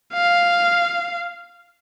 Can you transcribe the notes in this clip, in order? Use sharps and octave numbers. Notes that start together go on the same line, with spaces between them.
F5